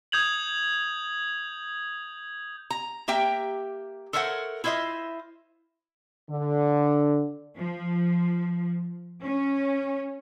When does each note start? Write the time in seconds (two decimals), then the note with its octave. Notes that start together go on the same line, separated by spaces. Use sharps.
0.12 D#6 G6 G#6 F7 F#7
2.70 A#5
3.08 A#3 G4 E5 G5 A#5
4.13 A4 A#4 C5 C#5 E5 F#5
4.64 E4 F4 C5 D#5 E5
6.30 D3
7.57 F3
9.21 C#4